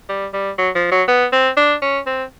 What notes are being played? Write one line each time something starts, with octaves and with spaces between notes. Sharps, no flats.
G3
G3
F#3
F3
F#3
B3
C4
D4
C#4
C4